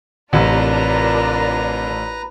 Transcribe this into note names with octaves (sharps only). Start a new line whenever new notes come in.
A1 C3 D4 F4 A#4 B4 A#5